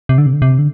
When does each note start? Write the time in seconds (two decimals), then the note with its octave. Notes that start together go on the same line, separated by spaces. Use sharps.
0.09 C3
0.18 D3
0.26 C3
0.33 D3
0.42 C3
0.59 D3